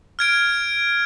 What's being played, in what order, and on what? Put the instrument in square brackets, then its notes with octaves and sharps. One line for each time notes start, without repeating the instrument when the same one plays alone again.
[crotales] F6 G#6 D7